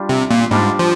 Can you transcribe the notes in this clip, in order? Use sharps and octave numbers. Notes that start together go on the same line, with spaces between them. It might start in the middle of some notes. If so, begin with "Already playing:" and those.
Already playing: G3 D4 F4
C3
A#2
G#2 G3 D4 F4
F3